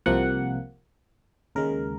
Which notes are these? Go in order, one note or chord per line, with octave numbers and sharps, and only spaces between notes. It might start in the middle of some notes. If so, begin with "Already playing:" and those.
C2 C3 F3 A#3 F#5
D#2 C#3 G#3 A#4